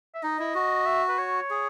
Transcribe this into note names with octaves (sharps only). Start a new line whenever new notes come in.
E5
D#4 D#5
E4
F#4
E5
B4
C#5
G#4